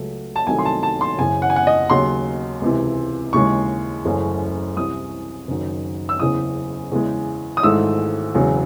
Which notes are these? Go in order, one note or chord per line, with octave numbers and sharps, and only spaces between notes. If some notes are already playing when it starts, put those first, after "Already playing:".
Already playing: C#2 C#3 F#3 A3
A5
C2 C3 D#3 F#3 A3 G#5
C6
A5
A5
C6
F#1 F#2 C#3 E3 G#5
F#5
G#5
F#5
D#5
D#2 C#3 F#3 C6
C#2 C3 E3
D#2 C#3 E3 G#3 C#6
F#1 F#2 C#3 E3 A3
C2 C3 E3 D#6
F#1 F#2 D#3 F#3
E6
F#1 E2 C#3 E3 D#6
E2 C#3 E3 G#3
D#6
G#1 G#2 E3 A3 E6
E1 E2 C#3 F#3